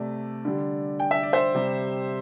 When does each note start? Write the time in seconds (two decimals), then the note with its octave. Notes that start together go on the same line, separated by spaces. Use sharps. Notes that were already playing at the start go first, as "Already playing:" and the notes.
Already playing: C3 A3 D5
0.45 D3 G3
1.00 G5
1.11 E5
1.23 D5
1.33 C5 E5
1.55 C3 G3